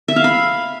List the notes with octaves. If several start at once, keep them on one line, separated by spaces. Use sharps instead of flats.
E5
F5
B5